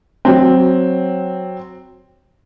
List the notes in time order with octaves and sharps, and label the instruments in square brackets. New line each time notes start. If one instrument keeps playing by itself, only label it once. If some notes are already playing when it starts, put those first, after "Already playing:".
[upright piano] F#3 C4